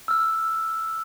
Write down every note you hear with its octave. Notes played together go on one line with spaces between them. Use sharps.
E6 F6